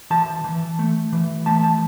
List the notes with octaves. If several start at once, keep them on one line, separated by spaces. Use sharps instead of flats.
E3 A5
E3
A3
E3
A3 A5
A5